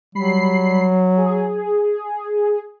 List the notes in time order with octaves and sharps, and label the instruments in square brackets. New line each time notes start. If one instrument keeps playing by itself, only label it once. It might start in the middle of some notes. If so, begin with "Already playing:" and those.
[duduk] F#3 [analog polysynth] G3 B5 C7
[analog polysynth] G#4